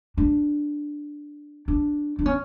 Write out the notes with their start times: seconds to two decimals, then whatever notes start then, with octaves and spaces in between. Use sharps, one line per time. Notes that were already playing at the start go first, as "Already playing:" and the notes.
0.17 D4
1.68 D4
2.19 D4
2.26 C#4